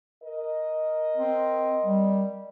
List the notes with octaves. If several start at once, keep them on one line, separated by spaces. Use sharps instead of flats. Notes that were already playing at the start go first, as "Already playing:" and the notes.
A#4 D#5
C4
G3